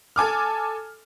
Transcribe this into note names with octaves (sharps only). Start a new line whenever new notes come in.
A4 G#5 D6 F6